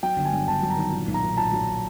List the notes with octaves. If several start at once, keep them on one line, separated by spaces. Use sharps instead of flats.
F#3 G5
G1
G#5
G2
G1 A5
F#3
A#5
D#3
A#2
B1
A#5
A#2
A#2 A5
F#3